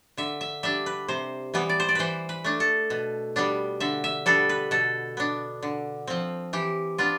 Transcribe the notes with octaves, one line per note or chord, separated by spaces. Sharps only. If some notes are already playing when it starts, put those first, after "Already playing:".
D3 E5
E5
G3 D4 E5
B4
C3 C5
E3 G3 B3
D5
C5
D5
E3 B4 C5
B4
A3 D4
A4
B2
G3 B3 D4
D3 E5
E5
G3 B3 D4 A4
B4
B2 A4
B3 D4
D3
F3 C4
E3 G4
B3 D4 F4